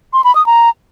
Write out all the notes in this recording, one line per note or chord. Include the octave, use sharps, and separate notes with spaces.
C6
B5
D#6
A#5